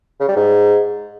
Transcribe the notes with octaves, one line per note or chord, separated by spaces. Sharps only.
C#3
G3
G#2